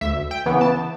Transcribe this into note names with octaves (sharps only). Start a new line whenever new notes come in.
D2 E5
G5
C#3 E3 B3
A5